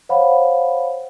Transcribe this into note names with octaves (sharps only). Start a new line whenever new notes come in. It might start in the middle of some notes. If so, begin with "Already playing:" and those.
C5 C#5 F5 F#5 B5